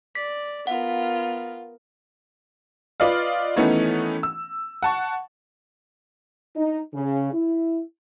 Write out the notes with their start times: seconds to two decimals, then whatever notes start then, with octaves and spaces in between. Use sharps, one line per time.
0.15 D5 B6
0.67 B3 F4 A#4 F#5
3.00 F4 B4 D5 D#5 F5
3.56 D#3 E3 A3 B3 C#4 D#4
4.23 E6
4.82 F#5 A5 C#6
6.56 D#4
6.93 C#3
7.33 E4